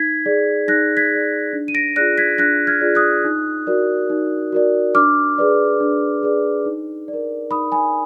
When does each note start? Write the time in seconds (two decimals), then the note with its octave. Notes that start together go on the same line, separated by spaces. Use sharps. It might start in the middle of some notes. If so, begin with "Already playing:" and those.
Already playing: D#4 G#6 B6
0.26 G#4 D5
0.68 D#4 F#6 A#6
0.97 G#6 B6
1.11 G#4 D5
1.53 D4
1.68 D#7
1.75 A#6 D7
1.96 F4 G#4 D5 F#6 A#6
2.18 G#6 B6
2.38 D4 F#6 A#6
2.67 F6 G#6
2.81 F4 G#4 D5
2.95 D#6 F#6
3.25 D#4
3.67 F#4 A#4 D5
4.10 D#4
4.52 F#4 A#4 D5
4.95 D4 D6 F6
5.38 G#4 B4 D5
5.80 D4
6.23 G#4 B4 D5
6.66 D#4
7.08 D5
7.13 A#4
7.51 D#4 B5 D#6
7.72 G#5 B5